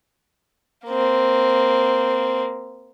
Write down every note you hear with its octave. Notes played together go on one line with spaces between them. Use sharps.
A#3 C4